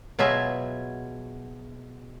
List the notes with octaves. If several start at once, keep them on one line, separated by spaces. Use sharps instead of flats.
B2 F#3 F4 G#4 E5